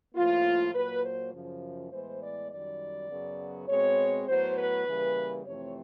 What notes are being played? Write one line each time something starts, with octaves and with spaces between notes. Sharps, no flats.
A2 F3 A#3 F4
A#2 F#3 A#3 B4
C5
F#2 C#3 F3
A2 E3 G#3 B3 C5
D5
F#2 D#3 G3 D5
F#2 C#3 F#3 B3
B2 G#3 C4 C#5
A2 F#3 B3 C5
B4
C#3 E3 G3 A#3
F2 C3 E3 A3 C4 C#5